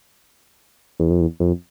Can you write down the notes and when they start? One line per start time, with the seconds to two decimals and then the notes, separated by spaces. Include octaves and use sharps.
1.00 E2
1.11 F2
1.21 E2
1.40 F2